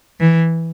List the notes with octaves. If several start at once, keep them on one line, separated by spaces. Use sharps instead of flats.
E3